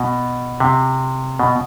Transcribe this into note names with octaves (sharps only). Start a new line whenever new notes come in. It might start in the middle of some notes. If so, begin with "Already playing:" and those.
Already playing: B2
C3
B2